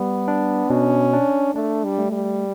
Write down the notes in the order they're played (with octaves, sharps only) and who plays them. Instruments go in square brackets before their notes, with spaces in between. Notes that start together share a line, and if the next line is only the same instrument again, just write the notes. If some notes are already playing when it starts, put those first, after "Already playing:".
Already playing: [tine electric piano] G3 [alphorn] B3
[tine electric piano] D4
[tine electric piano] B2 [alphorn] C#4
[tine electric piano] D4
[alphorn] A3 [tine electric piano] D4
[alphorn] G3
[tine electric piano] A3
[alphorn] G3